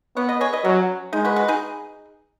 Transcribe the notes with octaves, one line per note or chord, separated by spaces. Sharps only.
B3 C#5 F#5
B4 D#5
G#4 C#5
B4 D#5
F#3 C#4
G#3 D#4
F#4 B4
F#4 B4
D#4 G#4